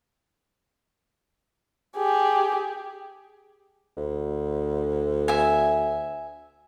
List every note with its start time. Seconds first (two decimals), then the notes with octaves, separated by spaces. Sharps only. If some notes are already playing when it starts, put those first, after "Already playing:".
1.97 G4 G#4
3.97 D2
5.28 E5 G#5